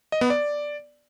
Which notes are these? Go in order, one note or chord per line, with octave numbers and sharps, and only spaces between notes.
D#5
B3
D5